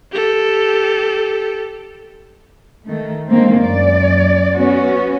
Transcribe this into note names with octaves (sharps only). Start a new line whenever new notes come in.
G4 A4
D#3 A3
D3 D#3 G#3 A#3 C4
F#2 D5
B3 C#4 F#4